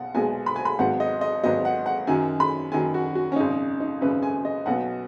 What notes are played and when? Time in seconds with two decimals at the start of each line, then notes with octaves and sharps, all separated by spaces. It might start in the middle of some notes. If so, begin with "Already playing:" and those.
Already playing: B1 B2 F#5
0.15 B1 B2 G#3 B3 G#5
0.46 B5
0.56 G#5
0.65 B5
0.79 G#1 G#2 F#3 B3 F#5
1.00 D#5
1.21 D#5
1.43 G#1 G#2 F#3 B3 D#5
1.65 F#5
1.86 F#5
2.07 F#2 D#3 F#3 G#5
2.40 B5
2.72 F#2 D#3 F#3 G#5
2.94 F#4
3.15 F#4
3.32 C#4
3.36 G#1 F#2 C#3 D#4
3.80 D#4
4.01 G#1 F#2 C#3 B4
4.23 G#5
4.45 D#5
4.66 B1 B2 F#3 B3 F#5